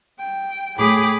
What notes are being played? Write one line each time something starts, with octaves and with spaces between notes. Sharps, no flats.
G5
A2 G#4 G5 B5 D6